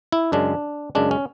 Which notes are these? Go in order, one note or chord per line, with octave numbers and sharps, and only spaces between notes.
E4
F#2 C#3 G#3 D4
F#2 C#3 G#3 D4
C#4